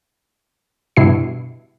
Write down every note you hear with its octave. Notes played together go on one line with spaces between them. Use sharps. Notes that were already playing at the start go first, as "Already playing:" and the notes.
G2 B2 E4 C7